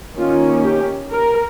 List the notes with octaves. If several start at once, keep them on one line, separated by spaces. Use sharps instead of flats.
D#3 A#3 C#4 F4
G4
A#4